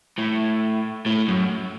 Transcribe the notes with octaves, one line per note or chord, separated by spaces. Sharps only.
A2
A2
F#2